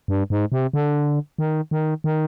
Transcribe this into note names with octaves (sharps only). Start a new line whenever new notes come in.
G2
G#2
C3
D3
D#3
D#3
D#3